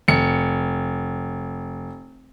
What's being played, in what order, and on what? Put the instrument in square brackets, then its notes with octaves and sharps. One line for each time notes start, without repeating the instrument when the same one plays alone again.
[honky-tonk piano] F1 C#7